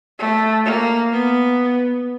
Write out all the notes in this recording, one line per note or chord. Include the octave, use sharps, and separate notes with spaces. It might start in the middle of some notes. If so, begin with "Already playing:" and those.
A3
A#3
B3